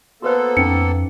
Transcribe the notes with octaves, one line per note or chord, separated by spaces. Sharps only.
A#3 B3 F#4 A4 B4 C5
F2 C#4 D#4 C#7